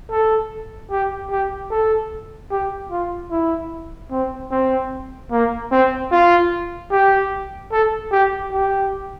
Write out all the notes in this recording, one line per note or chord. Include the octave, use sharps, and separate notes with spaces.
A4
G4
G4
A4
G4
F4
E4
C4
C4
A#3
C4
F4
G4
A4
G4
G4